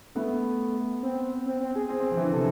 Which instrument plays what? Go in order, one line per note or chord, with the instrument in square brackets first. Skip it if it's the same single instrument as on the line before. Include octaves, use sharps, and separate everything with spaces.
[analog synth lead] A3 [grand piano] B3
[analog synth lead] C4
C4
C4
G#4
[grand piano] C4
C4
F3
E3
D3
[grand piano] C3 [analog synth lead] A4